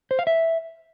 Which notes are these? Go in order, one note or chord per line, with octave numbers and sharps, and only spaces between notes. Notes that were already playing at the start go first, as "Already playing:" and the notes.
C5
F5
E5